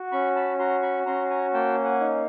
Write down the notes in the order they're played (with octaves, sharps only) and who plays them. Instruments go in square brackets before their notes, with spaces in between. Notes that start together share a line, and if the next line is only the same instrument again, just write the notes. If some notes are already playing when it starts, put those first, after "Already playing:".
Already playing: [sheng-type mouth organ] F#4
C#4 B5 C#6
A5 B5
F#4 A#5 C6
B5 C#6
C#4 A#5 C6
G#5 A#5
A#3 G5 A5
F#5 G#5
D#4